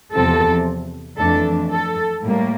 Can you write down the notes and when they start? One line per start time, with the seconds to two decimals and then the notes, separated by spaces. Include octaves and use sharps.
0.14 E2 C3 F3 C4 A4
1.18 F2 E3 A3 D4 A4
1.71 A4
2.24 A2 G3 A#3